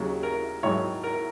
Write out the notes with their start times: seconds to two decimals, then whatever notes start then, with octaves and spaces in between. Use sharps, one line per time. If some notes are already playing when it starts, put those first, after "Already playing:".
Already playing: D#2 C#3 F#3
0.23 A#4
0.63 G#1 G#2 D#3 F#3 C#5
1.04 A#4